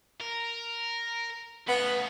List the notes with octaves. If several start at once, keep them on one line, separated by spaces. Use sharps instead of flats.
A#4
A2 C#3 B3